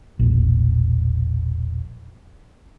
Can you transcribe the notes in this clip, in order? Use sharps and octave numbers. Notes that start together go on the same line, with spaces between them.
E1 A#1